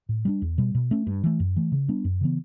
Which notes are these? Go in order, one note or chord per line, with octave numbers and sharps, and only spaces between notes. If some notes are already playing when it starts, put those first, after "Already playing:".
A2
G3 B3 D4
E2
B2 G3
B2
A3 C#4
G2
E3 A3
F#2
E3 A3
C#3
G3 B3 D4
F#2
C#3 E3 B3